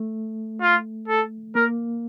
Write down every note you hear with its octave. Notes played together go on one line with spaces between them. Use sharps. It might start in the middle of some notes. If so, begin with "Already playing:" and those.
Already playing: A3
F4
A4
A#3 A#4